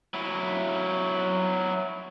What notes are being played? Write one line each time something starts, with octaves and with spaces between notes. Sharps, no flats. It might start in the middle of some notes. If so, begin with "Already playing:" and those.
F#3 E4